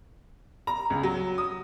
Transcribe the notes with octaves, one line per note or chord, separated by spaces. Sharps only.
A#5
C#2
F#3
D#6